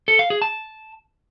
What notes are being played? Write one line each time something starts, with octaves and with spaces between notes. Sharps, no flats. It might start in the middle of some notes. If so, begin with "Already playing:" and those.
A4
F5
G#4
A5